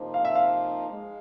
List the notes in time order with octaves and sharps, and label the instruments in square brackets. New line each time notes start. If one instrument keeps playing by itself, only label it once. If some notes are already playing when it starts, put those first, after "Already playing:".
Already playing: [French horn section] F2 C3 F3 A#3 D#4
[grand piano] F5
E5
F5
[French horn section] G#3